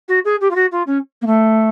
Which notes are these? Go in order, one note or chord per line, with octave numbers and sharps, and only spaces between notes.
F#4
G#4
G4
F4
F#4
F4
C#4
A#3
A3